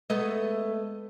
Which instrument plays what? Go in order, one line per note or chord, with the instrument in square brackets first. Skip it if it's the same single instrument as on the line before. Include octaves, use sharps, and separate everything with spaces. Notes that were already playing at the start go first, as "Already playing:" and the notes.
[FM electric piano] G#3 [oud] A3 B3 D#5